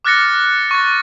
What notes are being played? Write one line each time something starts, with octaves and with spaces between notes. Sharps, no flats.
D6 F6 F#6 A6 A#6 C#7
C#6 A6